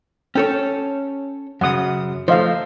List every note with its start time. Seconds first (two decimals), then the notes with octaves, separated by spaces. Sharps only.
0.35 C#4 A4 C#5 G5
1.61 F#2 C#3 F#5 D#6
2.28 F3 A3 C5 D#5 F5